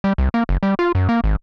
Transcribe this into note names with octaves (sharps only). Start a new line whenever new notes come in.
G3
C2
A#3
F#1
G3
F4
F#2
A#3
G#1